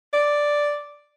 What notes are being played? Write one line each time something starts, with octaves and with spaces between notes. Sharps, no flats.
D5